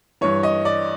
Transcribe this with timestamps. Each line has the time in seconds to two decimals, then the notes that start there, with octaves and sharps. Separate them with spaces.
0.21 G2 E3 C#5
0.43 D#5
0.65 D5